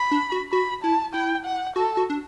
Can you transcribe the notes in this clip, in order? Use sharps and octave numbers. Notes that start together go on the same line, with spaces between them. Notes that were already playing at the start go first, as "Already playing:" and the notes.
Already playing: B5
D4
F#4
F#4 B5
E4 A5
E4 G5
F#5
F#4 A4
F#4
D4